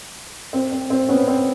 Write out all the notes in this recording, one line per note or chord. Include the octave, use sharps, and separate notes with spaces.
C4
C4
C4
B3 C#4
C4